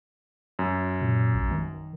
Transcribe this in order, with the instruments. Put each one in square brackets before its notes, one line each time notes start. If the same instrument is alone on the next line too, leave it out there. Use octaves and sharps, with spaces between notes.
[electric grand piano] F#2
[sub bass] A#2
A#1
D#3